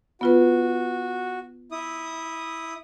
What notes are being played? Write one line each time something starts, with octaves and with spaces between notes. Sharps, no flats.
B3 F4 F#4 B4
E4 D#6